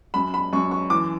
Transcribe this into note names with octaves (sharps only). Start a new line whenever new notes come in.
F#2 B5
B5
F#2 C#6
C#6
E3 D6